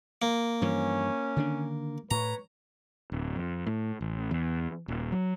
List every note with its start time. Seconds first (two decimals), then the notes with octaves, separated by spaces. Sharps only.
0.22 A#3
0.62 G2 E3 F3 C#4
1.36 D3 D#3 D4
2.11 A2 B4 C#5 A#5
3.12 D1
3.36 F2
3.67 A2
4.01 A1
4.31 E2
4.88 D#1
5.12 F#3